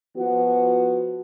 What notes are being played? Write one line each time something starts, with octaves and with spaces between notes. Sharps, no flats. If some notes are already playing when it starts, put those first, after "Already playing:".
F3 B3 F#4